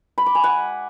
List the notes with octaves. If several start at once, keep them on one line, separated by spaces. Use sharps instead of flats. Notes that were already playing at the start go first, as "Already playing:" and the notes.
B5
D6
G#5
F#5